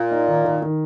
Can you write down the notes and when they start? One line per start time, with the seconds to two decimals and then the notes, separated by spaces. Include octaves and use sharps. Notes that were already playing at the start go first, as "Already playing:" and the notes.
Already playing: A#2
0.11 D#4
0.28 D#3
0.44 D#3
0.62 D#3